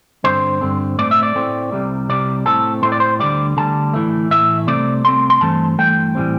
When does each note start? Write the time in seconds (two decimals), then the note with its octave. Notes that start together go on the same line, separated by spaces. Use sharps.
0.24 G2 D3 C4 C5
0.61 G2 D3 C4
0.98 A2 A3 C4 D5
1.11 E5
1.23 D5
1.35 A2 A3 C4
1.72 C2 C3 G3
2.09 C2 C3 G3 D5
2.46 A2 A3 C4 A4
2.83 A2 A3 C4 C5
2.92 D5
3.00 C5
3.19 D2 D3 G3 D5
3.57 D2 D3 G3 A5
3.94 A2 E3 A3
4.31 A2 E3 A3 E5
4.67 C2 C3 A3 C4 D5
5.04 C2 C3 A3 C4 C6
5.30 C6
5.41 G2 E3 A3 C4 A5
5.78 G2 E3 A3 G5
6.15 A2 E3 G3 C4